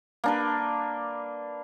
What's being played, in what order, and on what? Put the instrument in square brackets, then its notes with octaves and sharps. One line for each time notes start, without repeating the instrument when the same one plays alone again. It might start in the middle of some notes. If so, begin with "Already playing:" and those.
[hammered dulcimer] A#3 D4 B4